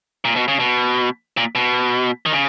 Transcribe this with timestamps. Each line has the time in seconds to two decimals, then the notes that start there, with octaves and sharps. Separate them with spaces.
0.25 A#2
0.36 B2
0.48 C#3
0.60 B2
1.37 A#2
1.55 B2
2.26 D#3
2.33 C#3